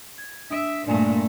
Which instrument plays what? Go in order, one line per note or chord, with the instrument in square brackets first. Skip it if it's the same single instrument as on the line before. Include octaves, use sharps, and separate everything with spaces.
[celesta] G#6
[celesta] D4 D#6 D7 [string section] E5
[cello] G2 A3 [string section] A#2 [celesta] D4 D5 G#5